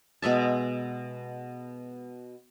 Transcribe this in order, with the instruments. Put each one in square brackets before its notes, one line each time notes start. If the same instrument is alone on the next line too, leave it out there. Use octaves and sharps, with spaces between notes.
[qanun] B2 G#3 E5 A5